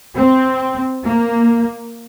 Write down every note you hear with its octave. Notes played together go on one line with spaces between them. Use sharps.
C4
A#3